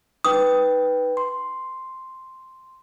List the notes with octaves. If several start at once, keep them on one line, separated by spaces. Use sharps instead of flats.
D#4 B4 G5 D#6
C6